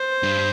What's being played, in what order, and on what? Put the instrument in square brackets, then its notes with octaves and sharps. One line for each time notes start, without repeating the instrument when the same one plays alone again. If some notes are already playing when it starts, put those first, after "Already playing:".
Already playing: [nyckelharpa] C5
[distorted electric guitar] G2